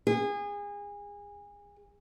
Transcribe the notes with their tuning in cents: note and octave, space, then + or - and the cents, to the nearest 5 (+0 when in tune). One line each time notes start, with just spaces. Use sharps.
G#4 -25